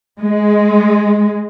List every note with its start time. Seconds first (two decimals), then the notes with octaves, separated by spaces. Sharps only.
0.21 G#3